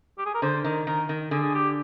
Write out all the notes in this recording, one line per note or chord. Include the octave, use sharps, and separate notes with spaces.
G4
G#4
A#4
D3 C5
D#3 A#4
D#3 A#4
D#3
D3 G#4
G#4
G4